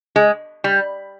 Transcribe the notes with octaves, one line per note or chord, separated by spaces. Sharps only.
G#3
G3